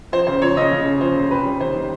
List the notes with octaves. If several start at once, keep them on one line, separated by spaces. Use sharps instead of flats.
F3 C5
C#3 C5
F3 C#5
C#3 D#5
C#3
C#3
F3 C5
C#3
C3 B4
G3
D#3 C5
D#3